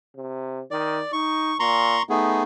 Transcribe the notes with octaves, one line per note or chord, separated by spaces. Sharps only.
C3
D#3 D5
D#4 C#6
A#2 A#5 C6 C#6
A3 B3 D#4 G#4